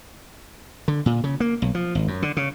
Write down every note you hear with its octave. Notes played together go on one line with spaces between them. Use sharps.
D3
A#2
C#3
A#3
B1
F3
G#1
F#2
D3
C#3